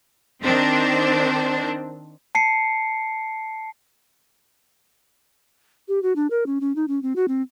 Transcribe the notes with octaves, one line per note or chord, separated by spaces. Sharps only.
D#3 C4 D4 C5
A5 C7 C#7
G4
F#4
D4
A#4
C#4
C#4
D#4
C#4
C4
F#4
C4